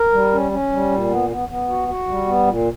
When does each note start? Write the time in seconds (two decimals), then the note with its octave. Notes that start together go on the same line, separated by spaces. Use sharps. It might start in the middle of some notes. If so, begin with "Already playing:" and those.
Already playing: A#4
0.12 G3
0.32 C#4
0.52 C#4
0.71 G3
0.91 A#2
1.10 B3
1.30 B3
1.49 B3
1.69 F#4
1.88 F#4
2.08 G3
2.27 B3
2.47 A#2